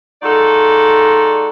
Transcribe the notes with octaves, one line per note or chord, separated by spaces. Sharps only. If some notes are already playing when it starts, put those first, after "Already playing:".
G#3 D#4 F4 F#4 A4 D5